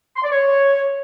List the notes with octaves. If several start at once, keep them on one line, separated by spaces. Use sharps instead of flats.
C6
D5
C#5